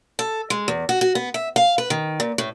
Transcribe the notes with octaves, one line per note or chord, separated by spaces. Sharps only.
A4
G#3
E2
F#4
F#4
B3
E5
F5
B4
D#3
A#2
A2